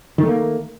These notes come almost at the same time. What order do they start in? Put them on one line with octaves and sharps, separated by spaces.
D#3 A3 A#3